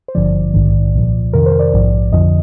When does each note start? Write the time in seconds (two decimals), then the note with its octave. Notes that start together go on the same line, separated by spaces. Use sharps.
0.08 C5
0.15 G#1 G2 D3 F3 D5
0.54 A#1 G#2 D#3
0.93 C2 A#2 F3
1.33 F2 C3 D#3 A#4
1.46 C5
1.59 D5
1.74 A#1 G#2 F3
2.12 F2 D3 F3 D#5